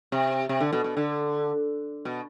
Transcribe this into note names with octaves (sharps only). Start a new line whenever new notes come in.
C3
C3
D3
B2
B2
D3
B2